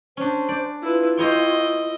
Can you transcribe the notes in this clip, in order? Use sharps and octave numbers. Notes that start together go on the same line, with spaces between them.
C#4 D4 C5
D5
E4 F4 B4
E4 C5 C#5 D#5 G5